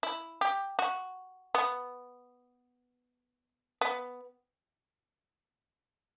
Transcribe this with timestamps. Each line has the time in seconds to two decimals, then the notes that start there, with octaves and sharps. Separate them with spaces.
0.03 E4
0.41 G4
0.79 F#4
1.55 B3
3.81 B3